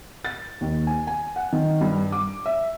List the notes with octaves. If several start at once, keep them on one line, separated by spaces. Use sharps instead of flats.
A6
D#2
G#5
G#5
F#5
D#3
G2
D6
E5